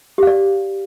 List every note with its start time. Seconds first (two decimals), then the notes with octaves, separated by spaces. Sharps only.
0.18 G4
0.23 F5
0.27 D5